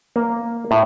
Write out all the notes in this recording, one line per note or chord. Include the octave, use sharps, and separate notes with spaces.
A#3
A2